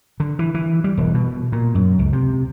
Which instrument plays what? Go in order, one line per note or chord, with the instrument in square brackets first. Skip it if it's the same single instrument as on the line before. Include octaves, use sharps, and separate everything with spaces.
[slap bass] D3
E3
E3
G3
E1
B2
A#2
F#2
C#2
C3